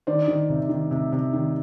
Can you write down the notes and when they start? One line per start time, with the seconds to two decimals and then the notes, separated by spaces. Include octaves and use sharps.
0.07 D#3 C5 D5
0.28 D#3
0.50 C3
0.69 D#3
0.91 C3
1.12 C3
1.33 D#3